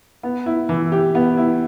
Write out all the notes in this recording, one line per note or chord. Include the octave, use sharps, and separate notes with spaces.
B3
E4
E3
G4
B3
E4